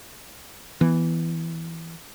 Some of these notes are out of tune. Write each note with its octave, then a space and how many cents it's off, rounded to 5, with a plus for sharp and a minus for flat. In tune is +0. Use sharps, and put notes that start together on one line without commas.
E3 +0 B3 +0